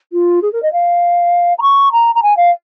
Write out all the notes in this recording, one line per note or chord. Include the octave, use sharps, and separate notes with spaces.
F4
G#4
A#4
D#5
F5
A#5
C#6
A#5
A#5
G#5
F5